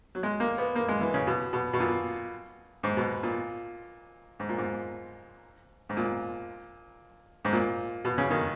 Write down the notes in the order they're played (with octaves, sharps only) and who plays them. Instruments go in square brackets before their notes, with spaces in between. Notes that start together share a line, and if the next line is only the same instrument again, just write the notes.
[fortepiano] F#3
G#3
A#3
B3
A#3
G#3
E3
C#3
B2
B2
B2
A#2
G#2
B2
A#2
G#2
A#2
G#2
G#2
A#2
G#2
A#2
B2
C#3
D#3